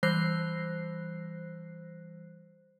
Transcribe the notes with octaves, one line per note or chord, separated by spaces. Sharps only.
E3 G3 C5 F#6 A#6 C7